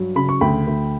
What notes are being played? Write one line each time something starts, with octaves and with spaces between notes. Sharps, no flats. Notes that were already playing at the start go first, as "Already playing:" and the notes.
Already playing: G2 F#3
C#3 B5
C#6
D2 G5 B5
D2